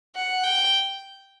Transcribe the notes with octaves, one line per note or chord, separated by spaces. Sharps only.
F#5
G5